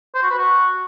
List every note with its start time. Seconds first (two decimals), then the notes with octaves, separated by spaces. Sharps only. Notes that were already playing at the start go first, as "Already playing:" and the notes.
0.15 C5
0.23 F#4
0.30 B4
0.38 F#4